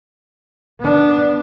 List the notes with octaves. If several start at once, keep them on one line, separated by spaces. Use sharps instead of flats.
B3 D4